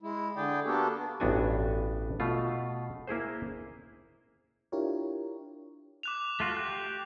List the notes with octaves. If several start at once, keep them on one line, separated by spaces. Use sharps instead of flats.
G#3 E4
D3 G#4 D5 G5
A#3 B3 D4 F#4 G4 A4
A1 G2 B3 D4 F#4 G#5
B2 A3 F4
A#3 E4 G#4 C5
D4 E4 F4 G4 A#4 C#5
D6 F#6 F7
A3 F4 F#4
G4 F#6